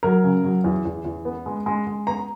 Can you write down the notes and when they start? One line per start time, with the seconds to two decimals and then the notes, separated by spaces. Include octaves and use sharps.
0.03 F#3 A#4
0.24 C#3
0.44 F#3
0.64 E2
0.85 E2
1.05 E2
1.25 B3
1.46 G#3
1.66 G#3
1.87 G#3
2.07 B3 A#5